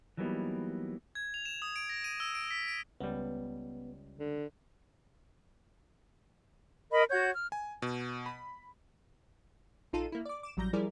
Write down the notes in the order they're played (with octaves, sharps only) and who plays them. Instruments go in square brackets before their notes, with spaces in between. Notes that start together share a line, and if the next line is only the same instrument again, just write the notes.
[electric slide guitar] E3 F#3 G3 A#3 B3 D#4
[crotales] G#6
F7
E7
D#6
D7
A#6
D#7
E6
D7
B6
D7
[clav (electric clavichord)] C#2 G3 [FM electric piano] B3
[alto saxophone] D3
[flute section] A#4 D#5 B5
F#4 C#5 F#5 G6
F6
[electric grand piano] G#5
B2
B5
[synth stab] A#1 D#4 F4 A4 D#7
A#3 E4
D5 D6
D6 E7
A1 F#3 G3 A#5 G6 A#6
F3 G3 E4 G#4 A#4 D5